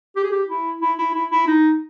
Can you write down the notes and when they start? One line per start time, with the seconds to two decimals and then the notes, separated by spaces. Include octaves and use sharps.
0.16 G4
0.23 G#4
0.32 G4
0.48 E4
0.81 E4
0.98 E4
1.14 E4
1.31 E4
1.47 D#4